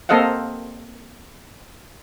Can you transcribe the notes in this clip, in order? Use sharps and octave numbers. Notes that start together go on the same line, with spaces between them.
A#3 C4 A4 D#5 F5 F#5